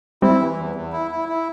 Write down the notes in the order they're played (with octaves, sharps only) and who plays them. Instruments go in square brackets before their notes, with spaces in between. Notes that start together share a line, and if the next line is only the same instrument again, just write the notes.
[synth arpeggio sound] G3 C4 [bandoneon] E4
[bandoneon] E3
E2
E2
E4
E4
E4